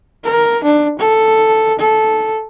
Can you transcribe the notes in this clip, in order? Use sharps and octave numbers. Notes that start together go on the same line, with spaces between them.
A#4
D4
A4
A4